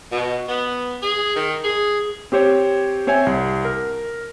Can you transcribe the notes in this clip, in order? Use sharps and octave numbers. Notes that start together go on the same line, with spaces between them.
B2
B3
G#4
D#3
G#4
C4 G4 C5 C#5
C4 C5 C#5 E5 G#5
C2
A#4